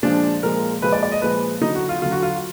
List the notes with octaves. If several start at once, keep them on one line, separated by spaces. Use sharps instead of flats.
A#2 F3 G#3 D4
A#2 F3 G#3 A#4
A#2 F3 G#3 B4
D5
D5
D#5
A#2 F3 G#3 B4
D3 F#3 D#4
F#4
F4
D3 F#3 F4
F#4
F4